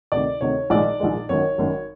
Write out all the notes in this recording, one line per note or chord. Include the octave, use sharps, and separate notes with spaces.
D2 C3 D#3 D5
D2 C3 D#3 C#5
A#1 G#2 D#3 G#3 D5
A#1 G#2 D#3 G#3
G#1 F#2 D#3 C#5
G#1 F#2 D#3